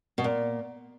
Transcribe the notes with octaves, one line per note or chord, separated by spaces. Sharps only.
B2
A#2